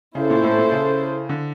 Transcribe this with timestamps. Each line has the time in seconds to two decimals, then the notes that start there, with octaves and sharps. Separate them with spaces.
0.15 C#3 C#4 E4 A4 C5
0.30 A#2
0.43 A2
0.58 A#2
0.72 C#3
1.29 D3